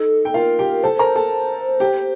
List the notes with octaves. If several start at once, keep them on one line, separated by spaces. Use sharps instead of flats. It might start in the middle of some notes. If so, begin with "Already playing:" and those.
Already playing: D#4 A4
G5
F4 A#4 F5
G4 G5
A4 C5 A5
A#4 A#5
A4 A5
G4 G5